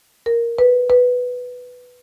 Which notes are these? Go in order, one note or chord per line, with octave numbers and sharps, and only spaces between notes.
A#4
B4
B4